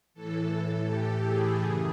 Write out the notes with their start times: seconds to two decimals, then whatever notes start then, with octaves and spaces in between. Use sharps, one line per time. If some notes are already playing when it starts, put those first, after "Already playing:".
0.14 A2 E3 A4
0.50 A4
0.86 G4
1.22 G#4
1.59 F#2 C#3 E3 G#4